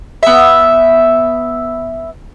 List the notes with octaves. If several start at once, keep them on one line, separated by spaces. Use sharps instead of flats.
B3 E5